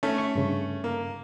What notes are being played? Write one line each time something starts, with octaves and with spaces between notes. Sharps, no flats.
A3 C#4
C#6
G2 C#3
A#3